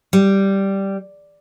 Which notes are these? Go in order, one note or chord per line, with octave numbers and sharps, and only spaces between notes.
G3